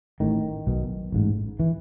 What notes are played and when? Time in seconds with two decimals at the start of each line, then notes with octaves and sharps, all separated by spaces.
0.20 A1 A2 D#3
0.67 B1 B2
1.12 A1 G#2
1.60 E3